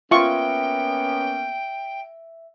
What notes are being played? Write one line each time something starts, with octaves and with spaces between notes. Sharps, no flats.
A#3 B3 C#4 F4 E5 G5 C#6